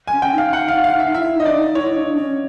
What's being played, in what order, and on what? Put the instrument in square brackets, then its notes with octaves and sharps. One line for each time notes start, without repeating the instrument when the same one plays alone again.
[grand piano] G#5
[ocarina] C#4
[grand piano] G5
[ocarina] D#4
[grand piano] F5
F#5
F5
F5
E5
[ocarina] E4 [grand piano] E5
[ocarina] D#4 [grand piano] D#5
[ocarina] D4 [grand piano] D5
[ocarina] D#4
[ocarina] E4 [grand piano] C#5
[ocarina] D4
C#4